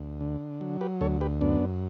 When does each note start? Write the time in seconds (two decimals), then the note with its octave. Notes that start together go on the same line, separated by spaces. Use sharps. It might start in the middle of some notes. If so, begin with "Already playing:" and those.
Already playing: D2
0.21 D3
0.61 F#3
0.81 G4 B4
1.01 D2 A4 C#5
1.21 G4 B4
1.41 F#2 B3 D4